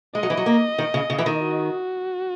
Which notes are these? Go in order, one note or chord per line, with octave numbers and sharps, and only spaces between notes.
G#3 D#5
F#3
E3
F#3
A#3
D#3
C#3
C#3
E3
D#3
F#4